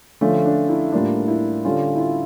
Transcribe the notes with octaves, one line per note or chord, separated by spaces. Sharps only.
D3 F3 A3 C#4 F4
D4
E4
A2 G3 A#3 D4 F4
E4
D3 G3 C#4 F4
E4
F4